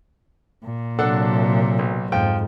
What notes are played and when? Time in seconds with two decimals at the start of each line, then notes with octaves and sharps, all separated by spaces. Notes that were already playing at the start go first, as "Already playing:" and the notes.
0.65 A#2
0.99 C3 F#3 D4 A4 F#5
1.79 B1
2.12 F2 G#2 F3 G5